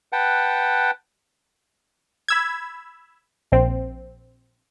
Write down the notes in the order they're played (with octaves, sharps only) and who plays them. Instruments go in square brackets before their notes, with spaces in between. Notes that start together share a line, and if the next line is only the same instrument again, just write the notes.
[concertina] B4 F#5 G5 A5
[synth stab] B5 E6 G#6
A#1 C4